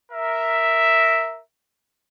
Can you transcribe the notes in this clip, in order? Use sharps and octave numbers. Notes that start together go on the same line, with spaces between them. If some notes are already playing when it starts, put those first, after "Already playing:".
A#4 E5